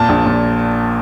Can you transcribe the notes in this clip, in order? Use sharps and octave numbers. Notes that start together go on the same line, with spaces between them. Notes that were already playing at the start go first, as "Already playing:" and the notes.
Already playing: A#2 A5
A#1
A#2